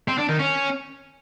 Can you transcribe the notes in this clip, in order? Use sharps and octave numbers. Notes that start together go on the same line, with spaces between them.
C4
D4
D#3
C#4